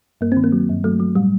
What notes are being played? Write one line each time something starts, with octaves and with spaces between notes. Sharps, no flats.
G2 A#3
D#3 C4
A#3
F#3
G2
F#3 A3
F#3
A2 G3